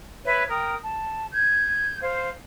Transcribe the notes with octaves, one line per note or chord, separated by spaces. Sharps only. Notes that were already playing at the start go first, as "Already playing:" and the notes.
B4 C#5 E5
A#4 G5 D#6
A5
G6 G#6
C5 F5